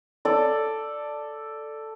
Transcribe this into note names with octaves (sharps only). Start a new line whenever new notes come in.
A4 D5